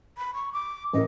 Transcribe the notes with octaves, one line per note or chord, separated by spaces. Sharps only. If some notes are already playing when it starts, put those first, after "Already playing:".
B5
C#6
D6
A1 A#4 D#5